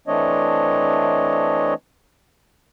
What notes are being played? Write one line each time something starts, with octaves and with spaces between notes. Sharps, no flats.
E3 A3 C4 D4 C#5 D#5